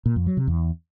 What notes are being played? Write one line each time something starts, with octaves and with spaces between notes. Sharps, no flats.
A#2
F2
F#3
C3
E2